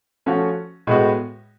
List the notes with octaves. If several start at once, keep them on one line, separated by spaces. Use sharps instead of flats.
F3 A3 C#4 F#4
A2 G#3 B3 F#4